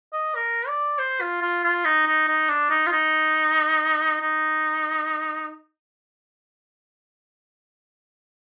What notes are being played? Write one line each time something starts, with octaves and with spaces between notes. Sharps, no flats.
D#5
A#4
D5
C5
F4
F4
F4
D#4
D#4
D#4
D4
D#4
F4
D#4
D#4